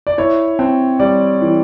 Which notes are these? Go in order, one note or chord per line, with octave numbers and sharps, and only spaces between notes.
D5
E4 C#5
C4
G3 D5
E3